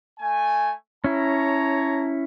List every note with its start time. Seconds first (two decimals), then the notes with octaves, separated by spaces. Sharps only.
0.19 A3 G#5
1.04 C#4 E4 C#5 A5 A#5